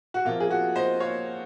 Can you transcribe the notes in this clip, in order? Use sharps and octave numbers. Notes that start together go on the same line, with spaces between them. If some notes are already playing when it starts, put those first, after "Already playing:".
F#4
C3 F3 A#3 F4
G#4
F#4
C5 D#5
C#5 F5